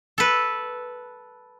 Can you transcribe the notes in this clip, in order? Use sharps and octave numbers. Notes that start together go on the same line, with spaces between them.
A4 B4